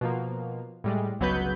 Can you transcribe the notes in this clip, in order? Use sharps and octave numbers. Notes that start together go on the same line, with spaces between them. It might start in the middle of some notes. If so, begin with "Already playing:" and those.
B2 F3 A#3
A2 G3 G#3
G1 C#2 F#3 B3 B4 G6